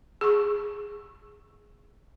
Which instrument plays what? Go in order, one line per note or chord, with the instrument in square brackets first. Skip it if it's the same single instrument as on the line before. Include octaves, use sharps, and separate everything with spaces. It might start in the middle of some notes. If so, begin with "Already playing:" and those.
[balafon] G#4 C#6